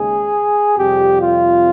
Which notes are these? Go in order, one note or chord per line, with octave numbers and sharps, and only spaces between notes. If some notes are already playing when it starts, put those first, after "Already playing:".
Already playing: D#2 C#3 G#3 G#4
F2 C3 G3 G4
F4